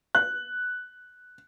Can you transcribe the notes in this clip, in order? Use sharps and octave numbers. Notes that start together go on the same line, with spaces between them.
F#6